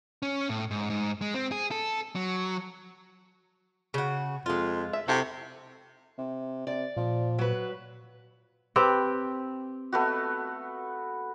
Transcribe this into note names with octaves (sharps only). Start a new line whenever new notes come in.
C#4
A2
G#2
G#2
G#3
C4
G#4
A4
F#3
C#3 F#4
F2 G#3 F4
E5
C3 E4 F#4 A4
C3
C3 D5
A#2 F3
F#3 B4
C4 G4 B4
A3 B3 F#4